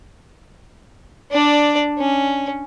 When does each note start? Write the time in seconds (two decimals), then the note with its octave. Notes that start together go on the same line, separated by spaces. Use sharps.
1.31 D4 D5
1.98 C#4